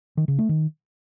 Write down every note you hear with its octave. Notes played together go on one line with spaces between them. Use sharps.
D#3
C#3
A3
D#3